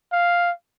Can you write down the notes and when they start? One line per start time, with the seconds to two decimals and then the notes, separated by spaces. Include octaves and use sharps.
0.13 F5